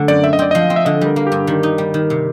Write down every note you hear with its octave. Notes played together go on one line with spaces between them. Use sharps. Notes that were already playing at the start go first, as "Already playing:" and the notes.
Already playing: D3 F#3 A3
F#2 D5
C4 E5
D#5
C4 D5
F3 D#5
C4
E5
D3 D#5
G3 A#4
A#3
G4
G2
D#3
D#4
G3
D#3
C3